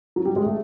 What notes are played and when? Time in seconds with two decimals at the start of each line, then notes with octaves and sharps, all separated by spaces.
0.16 F#3
0.25 G3
0.36 G#3
0.46 A3